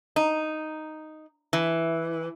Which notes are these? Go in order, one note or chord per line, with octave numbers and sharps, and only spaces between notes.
D#4
E3